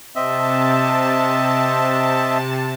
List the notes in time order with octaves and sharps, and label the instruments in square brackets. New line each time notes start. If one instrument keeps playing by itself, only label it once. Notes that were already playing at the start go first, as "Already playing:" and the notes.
[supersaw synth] C3 A5 [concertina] C4 D#5 E5